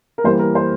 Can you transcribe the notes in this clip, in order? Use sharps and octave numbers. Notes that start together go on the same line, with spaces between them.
A#4
E3 G3 A#3 C5
A#4
C5